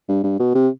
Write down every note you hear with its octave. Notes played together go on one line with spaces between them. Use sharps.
G2
G2
B2
C3